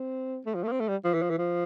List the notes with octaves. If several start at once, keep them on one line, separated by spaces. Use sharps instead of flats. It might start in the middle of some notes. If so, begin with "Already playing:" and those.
Already playing: C4
A3
F3
A3
A#3
C4
A3
G3
F3
E3
F3
E3
F3